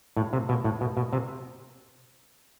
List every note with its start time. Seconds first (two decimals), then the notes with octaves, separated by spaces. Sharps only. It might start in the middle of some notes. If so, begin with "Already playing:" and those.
0.17 A2
0.33 C3
0.49 B2
0.64 A2
0.81 B2
0.97 B2
1.13 C3